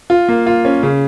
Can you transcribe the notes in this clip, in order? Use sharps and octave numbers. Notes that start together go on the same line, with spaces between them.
F4
A#3
F4
C#4
C#3